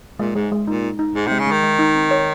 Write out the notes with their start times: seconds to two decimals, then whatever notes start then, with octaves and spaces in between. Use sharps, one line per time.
0.19 A#2 G#3
0.35 G#2 G#3
0.52 G#3
0.68 A#2 D#4
0.83 D#4
0.99 D#4
1.15 G#2 D#4
1.27 C3 G#3
1.39 C#3
1.47 D#3 G#3
1.63 G#3
1.79 D#4
1.95 C4
2.11 C#5